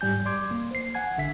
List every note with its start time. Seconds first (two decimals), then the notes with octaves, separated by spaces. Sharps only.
0.01 G#2 G3 G#5 G6
0.25 D5 C6 D6 G#6
0.51 A#3
0.71 C5 C7
0.94 F#5 G#5 G#6
1.17 A1 D3 E5 B6